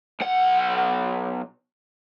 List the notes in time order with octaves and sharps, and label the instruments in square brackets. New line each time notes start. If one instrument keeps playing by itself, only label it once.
[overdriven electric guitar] B1 F#5